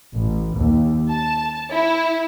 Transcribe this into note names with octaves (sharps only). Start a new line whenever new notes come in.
A1
D#2
A5
E4